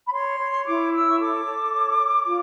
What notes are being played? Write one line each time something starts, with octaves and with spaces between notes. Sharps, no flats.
B5
C#5 C6
C#5
E4 D6
C#5 E6
C#6
A4 D6
A4
C#5
C#5
F4